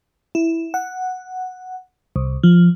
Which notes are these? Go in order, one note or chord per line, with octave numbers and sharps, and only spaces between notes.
E4
F#5
C2
F3